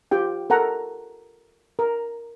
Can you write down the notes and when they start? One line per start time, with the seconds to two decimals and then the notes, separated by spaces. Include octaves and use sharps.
0.11 F4 G4 G5
0.50 A4 A#4 F#5 A#5
1.79 A#4